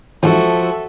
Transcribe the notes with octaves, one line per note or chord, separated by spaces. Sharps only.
E2 G#2 F3 F#4 A4 E5